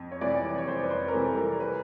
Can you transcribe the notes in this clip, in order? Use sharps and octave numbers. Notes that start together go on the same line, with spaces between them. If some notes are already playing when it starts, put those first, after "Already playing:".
Already playing: F2
C#5
C3 E3 G3 D5
C#5
F2 C5
B4
C5
A#4
C3 E3 G3 A4
A#4
B4